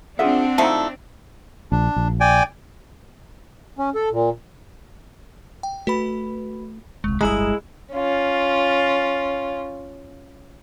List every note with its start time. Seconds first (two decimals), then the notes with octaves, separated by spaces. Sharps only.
0.19 C4 D4 F4 G#4 E5 F#5
0.58 D3 F3 A3 D#4 E4
1.72 A#1 D4
1.96 A#1
2.20 D5 G5 G#5
3.79 C#4
3.95 A4
4.11 A#2
5.63 G5
5.87 A3 F#4 B4 B5
7.04 D#1 C2 G#3
7.21 D1 G1 G3 G#3 E4 A#5 D#6
7.93 C#4 F4